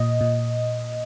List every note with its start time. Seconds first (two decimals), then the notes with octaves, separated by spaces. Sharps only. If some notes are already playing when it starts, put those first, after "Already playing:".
Already playing: A#2 D#5
0.21 A#2